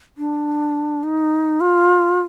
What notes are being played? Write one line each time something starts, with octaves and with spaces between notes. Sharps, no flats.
D4
D#4
F4